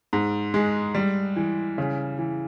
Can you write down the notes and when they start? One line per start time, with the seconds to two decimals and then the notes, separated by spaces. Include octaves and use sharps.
0.13 G#2
0.54 G#3
0.95 G3
1.36 E3
1.78 C#3
2.18 E3